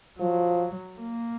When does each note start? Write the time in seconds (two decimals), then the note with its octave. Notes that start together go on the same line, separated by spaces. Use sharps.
0.19 F3 F#3
0.99 A#3